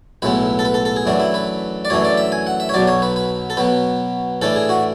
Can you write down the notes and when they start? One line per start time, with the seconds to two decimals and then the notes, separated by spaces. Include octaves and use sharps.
0.22 B1 A2 G#3 B3 B4
0.59 A4
0.65 B4
0.74 A4
0.85 A4
0.96 G#4
1.06 F#2 E3 A3 D4 F#4
1.20 E4
1.34 B4
1.85 D5
1.90 F#2 E3 A3 D4 C#5
2.05 D5
2.17 E5
2.32 G#5
2.47 F#5
2.60 E5
2.69 C#5
2.74 B1 B2 F#3 D5
2.87 C#5
3.02 B4
3.16 B4
3.50 A4
3.57 B2 F#3 B3 B4
4.42 A2 E3 A3 D4 A4
4.56 G#4
4.69 F#4